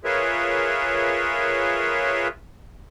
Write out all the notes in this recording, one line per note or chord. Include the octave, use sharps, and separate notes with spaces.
F4 G#4 A#4 B4 C#5 E5